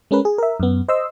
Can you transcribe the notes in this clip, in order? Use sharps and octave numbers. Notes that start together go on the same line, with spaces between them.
G#3 C#4 A#4 B4
G#4
A#4 E5
F#2 B3
C5 D#5 C6 E6